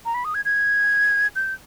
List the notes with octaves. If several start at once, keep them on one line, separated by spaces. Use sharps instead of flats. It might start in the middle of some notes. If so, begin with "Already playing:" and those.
A#5
B5
D#6
G#6
G#6
G6